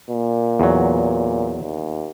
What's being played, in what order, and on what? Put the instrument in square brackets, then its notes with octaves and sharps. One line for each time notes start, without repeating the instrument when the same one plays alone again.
[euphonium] A#2
[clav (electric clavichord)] E2 F#3
[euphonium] D#2